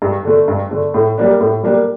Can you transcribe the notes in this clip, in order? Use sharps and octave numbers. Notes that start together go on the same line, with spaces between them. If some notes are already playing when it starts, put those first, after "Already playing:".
G2
D3 A3
G2
D3 A3
A2
G3 A#3 D4
A2
G3 A#3 D4